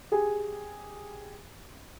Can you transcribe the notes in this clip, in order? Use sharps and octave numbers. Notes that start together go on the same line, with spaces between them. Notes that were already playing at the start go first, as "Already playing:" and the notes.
G4 G#4 G#5